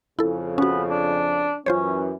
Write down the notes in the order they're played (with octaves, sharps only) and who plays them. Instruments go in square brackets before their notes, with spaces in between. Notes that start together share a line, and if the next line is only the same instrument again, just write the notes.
[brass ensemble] F2 C#3 [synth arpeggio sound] E4 A4
[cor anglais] B3 [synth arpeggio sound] C#4 F#4
[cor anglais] D4
[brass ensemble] F#2 E3 [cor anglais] C#4 [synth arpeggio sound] F4 C5 C#5